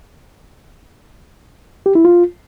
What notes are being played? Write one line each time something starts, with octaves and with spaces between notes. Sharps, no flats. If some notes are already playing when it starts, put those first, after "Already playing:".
G4
E4
F4